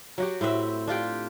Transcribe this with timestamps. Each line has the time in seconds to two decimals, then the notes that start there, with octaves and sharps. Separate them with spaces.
0.18 F#3 F#4 G4
0.41 A2 C4 B4 E5
0.87 D4 F4 G4 G5